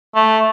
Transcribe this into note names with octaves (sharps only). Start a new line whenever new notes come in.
A3